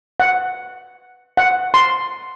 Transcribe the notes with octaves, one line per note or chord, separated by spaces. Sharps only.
F#5
F#5
C6